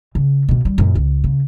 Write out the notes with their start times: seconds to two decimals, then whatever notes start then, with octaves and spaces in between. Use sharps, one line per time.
0.15 C#3
0.49 B2 A#3
0.65 G3
0.78 F#2 A#2
0.95 C#2
1.24 C#3